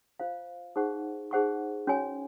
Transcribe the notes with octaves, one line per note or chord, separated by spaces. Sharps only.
F4 C5 F5
D#4 G#4 C5 F#5 C#6
D#4 G#4 C5 F#5 C#6
C#4 F#4 C#5 G#5